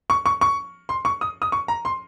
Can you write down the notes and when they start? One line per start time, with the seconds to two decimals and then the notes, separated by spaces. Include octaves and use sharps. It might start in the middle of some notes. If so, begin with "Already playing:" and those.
0.10 C#6
0.26 C#6
0.41 C#6
0.89 C6
1.05 C#6
1.21 D#6
1.42 D#6
1.52 C#6
1.68 A#5
1.85 C6